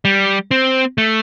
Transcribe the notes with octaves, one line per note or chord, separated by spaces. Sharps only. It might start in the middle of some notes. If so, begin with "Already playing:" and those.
G3
C4
A3